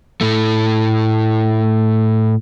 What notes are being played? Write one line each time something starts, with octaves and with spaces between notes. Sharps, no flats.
A2 A3